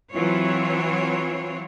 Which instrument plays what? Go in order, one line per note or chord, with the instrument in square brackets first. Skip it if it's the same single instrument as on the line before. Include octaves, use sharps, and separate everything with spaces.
[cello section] E3 F#3 C4 F4 C#5